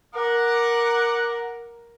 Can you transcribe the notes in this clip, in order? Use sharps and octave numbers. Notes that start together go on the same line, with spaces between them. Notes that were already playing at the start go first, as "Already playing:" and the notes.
A#4 F#5 D6